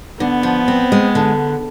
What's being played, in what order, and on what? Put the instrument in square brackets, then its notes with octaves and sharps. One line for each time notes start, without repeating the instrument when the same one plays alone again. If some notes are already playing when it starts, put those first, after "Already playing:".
[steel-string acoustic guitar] D3 [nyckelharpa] B3
[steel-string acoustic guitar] F3
C4
G#3
D3